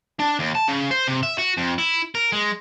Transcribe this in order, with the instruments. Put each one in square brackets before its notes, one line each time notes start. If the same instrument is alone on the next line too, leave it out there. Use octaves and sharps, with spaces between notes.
[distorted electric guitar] D4
D#2
A5
C#3
C5
C3
E5
F#4
F2
E4
A#4
G#3